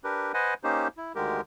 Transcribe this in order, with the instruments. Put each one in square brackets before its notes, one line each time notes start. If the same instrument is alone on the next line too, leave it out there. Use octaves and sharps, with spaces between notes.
[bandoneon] D4 G4 A#4 B4
B4 C5 D#5 F#5 G#5
A#3 C#4 D#4 G4 C5
E4
D2 D3 D#3 G#3 G4 A#4